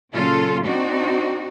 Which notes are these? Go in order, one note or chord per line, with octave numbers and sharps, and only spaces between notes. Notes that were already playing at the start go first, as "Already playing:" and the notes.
A#2 C#3 F#3 F4 A4
C4 D4 D#4 F#4